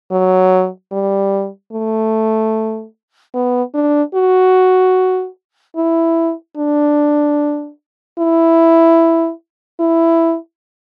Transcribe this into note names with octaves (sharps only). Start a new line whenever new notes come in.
F#3
G3
A3
B3
D4
F#4
E4
D4
E4
E4